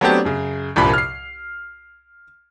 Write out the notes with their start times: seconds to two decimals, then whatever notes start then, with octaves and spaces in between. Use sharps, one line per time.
0.01 F#3 A3 B3 C4 D4 G4
0.25 F#2 C#3
0.76 C2 G2 A#2 F3 B5
0.94 F6 C7